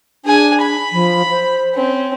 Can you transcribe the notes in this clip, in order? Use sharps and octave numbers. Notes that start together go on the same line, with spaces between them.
D4 G#4 G#5
B5
F3
C5
C4 C#4